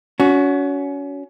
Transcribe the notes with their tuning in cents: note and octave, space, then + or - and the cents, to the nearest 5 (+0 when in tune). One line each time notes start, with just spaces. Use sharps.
C#4 +30 F#4 +0